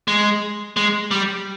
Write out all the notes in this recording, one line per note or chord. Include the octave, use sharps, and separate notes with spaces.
G#3
G#3
G3